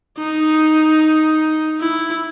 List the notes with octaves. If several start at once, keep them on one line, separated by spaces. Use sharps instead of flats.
D#4
E4